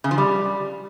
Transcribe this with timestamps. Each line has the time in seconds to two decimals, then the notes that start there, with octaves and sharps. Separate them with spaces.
0.04 C#3
0.11 F3
0.18 G3